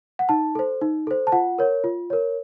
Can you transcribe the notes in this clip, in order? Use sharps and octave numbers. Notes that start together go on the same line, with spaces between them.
F#5
D#4 A5
A4 C5
D#4
A4 C5
A5
F4 F#5
A#4 C#5
F4
A#4 C#5